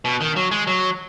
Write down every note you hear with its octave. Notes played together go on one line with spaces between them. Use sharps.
B2
D#3
F#3
G#3
F#3